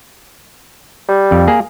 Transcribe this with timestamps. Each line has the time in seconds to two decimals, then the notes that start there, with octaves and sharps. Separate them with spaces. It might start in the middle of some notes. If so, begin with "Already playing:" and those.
1.09 G3
1.31 F2
1.48 A#3 G#4